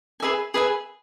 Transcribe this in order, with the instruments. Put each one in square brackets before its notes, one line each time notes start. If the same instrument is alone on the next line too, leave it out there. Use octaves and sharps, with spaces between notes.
[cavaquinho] G#4 B4 E5 G#5
G#4 B4 E5 G#5